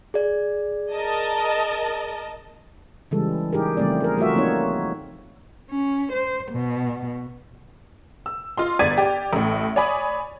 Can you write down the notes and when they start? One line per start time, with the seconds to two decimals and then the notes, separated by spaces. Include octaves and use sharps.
0.14 G#4 D5
0.94 A#4 D#5 A5
3.11 C#3 E3 G3 G#3 A4
3.53 D#4 G4 G#4 A#4
3.77 C#3 F3 G3 A3 C4 D5
4.00 G#4 A#4
4.17 G3 A3 F4 F#4 E5
4.34 F3 A#3 C4 D#4 C#5
5.71 C#4
6.13 C5
6.52 B2
8.26 E6
8.57 F4 D#5 C6
8.79 G1 D5 G#6 A6 B6 D#7
8.98 G4 D5
9.33 A1 A2
9.76 C#5 D5 G#5 B5 D6 D#6